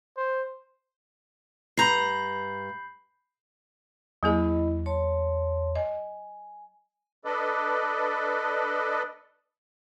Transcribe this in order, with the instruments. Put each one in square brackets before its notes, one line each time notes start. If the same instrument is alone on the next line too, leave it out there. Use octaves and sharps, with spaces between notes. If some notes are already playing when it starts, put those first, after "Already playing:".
[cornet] C5
[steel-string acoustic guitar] G2 A#5 [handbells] B5 G6 C7
[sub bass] E2 [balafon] F#3 A#3 G#4 [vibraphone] E4 D#5 B5
[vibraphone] C#5 A5 C6
[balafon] D#5 [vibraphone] G#5
[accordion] D4 A4 B4 D5 D#5